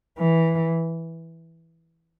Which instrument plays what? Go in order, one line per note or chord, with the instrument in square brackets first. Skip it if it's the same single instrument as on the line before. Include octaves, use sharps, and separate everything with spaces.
[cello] E3